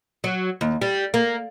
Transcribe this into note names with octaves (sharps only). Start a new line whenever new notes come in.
F#3
D#2
G3
A#3